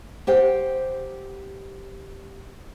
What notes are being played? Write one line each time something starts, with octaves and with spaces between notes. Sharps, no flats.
G4 C5 F#5 G5